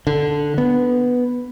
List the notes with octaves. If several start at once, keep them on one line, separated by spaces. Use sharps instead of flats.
D3
B3